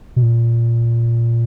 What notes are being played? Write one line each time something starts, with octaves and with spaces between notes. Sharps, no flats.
B2
A#2